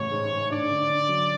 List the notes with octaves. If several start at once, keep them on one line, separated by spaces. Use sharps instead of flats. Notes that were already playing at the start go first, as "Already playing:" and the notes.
Already playing: A1 C#3 C#5
G#2
G#2
D4 D5
D3
D3
F#3